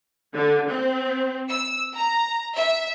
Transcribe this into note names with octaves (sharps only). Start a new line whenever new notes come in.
D3
C4
E6
A#5
E5